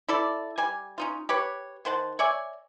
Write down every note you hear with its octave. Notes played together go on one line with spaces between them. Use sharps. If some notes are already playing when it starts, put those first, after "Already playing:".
E4 A4 D5
G3 G#5
C#4 D#4 F4
G4 B4 C#5
D#3 C5 F#5 A5
C#5 D5 E5 G#5